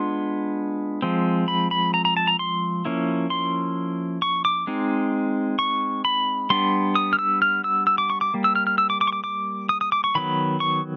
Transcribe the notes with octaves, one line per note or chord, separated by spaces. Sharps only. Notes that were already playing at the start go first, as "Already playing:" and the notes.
Already playing: G#3 B3 D4 F4 C6
F3 G#3 C4
B5
B5
A#5
A#5
A5
A#5
C6
F3 A#3 C#4 E4
C6
C#6
D6
G#3 C4 D#4
C#6
B5
G3 B3 D4 C6
D#6
F6
E6
F6
E6
E6
D6
C#6
D6
G3 A#3
E6
F6
F6
E6
D6
D6
C#6
D6
D6
D#6
D#6
D6
C#6
D#3 F#3 B3 B5
C#6